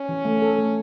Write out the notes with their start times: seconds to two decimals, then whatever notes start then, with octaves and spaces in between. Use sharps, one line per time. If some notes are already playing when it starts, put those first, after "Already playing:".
Already playing: C#4
0.09 E3
0.25 A3
0.42 A4
0.58 A3